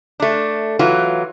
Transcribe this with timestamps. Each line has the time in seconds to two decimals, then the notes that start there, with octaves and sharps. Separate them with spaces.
0.20 A3 D4
0.79 E3 F#3 F4